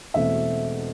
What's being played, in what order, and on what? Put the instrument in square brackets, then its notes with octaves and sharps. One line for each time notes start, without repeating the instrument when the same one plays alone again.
[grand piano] E1 E2 B2 A3 C4 E5